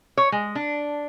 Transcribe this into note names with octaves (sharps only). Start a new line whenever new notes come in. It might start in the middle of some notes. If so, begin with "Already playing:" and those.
C#5
G#3
D4